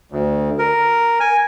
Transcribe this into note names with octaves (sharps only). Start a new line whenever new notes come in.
D2
A#4
G#5